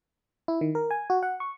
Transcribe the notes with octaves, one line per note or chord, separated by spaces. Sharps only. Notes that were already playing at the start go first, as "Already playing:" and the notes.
E4
D#3
A#4
G#5
F#4
F#5
C#6